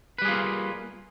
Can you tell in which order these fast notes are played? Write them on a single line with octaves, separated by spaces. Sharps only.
B4 G3 G#4 F4 A#3